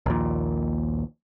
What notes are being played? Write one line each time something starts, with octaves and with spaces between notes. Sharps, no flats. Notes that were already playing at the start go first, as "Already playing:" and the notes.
A#1 D#2 A#2